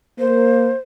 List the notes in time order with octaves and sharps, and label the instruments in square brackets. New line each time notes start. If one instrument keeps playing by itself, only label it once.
[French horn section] A#3 [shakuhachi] C5